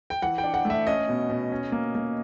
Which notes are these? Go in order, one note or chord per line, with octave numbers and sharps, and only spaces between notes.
G5
E3 F#5
G5
D4
F#5
A3
E5
C#4 D#5
B2
B2
C#4
A#3
A#3